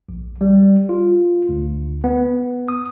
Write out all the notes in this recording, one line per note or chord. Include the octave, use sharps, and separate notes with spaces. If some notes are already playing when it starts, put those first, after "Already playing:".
A#1
G3
F4
D2
B3
D#6